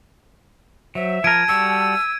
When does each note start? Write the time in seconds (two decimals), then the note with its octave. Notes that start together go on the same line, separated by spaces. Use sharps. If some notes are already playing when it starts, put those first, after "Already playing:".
0.95 F#3 C5 E5
1.24 F3 A#4 A5 G#6 D7 D#7
1.48 G3 F#4 A4 E6